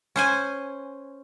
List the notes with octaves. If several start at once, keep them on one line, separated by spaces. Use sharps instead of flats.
C#4 C5 G#5